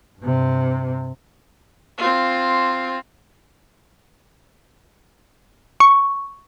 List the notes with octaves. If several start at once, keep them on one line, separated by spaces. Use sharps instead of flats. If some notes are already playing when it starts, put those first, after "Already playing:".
G2 C3
C4 F4
C#6